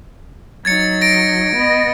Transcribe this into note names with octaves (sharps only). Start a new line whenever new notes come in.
F#3 D#4 G#6 A6 C#7
A#6 D7
B3 D#5